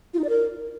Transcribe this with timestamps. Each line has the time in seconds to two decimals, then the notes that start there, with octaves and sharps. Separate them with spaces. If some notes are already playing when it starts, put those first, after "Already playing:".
0.14 F4
0.19 D#4
0.24 D5
0.29 A#4